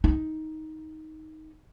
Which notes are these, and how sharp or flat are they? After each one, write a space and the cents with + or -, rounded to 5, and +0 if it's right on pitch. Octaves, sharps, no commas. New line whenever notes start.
D#4 +10